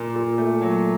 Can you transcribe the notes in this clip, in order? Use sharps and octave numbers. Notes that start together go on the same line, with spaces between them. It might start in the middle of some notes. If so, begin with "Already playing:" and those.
Already playing: A#2
A#2
A3
F#3